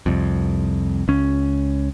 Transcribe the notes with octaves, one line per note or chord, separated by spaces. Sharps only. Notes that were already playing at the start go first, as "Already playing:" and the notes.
C2 F2
C#2 C#4